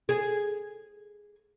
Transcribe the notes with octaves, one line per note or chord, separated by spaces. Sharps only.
G#4